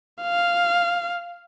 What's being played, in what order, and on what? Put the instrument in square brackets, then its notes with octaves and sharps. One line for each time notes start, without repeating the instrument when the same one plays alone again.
[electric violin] F5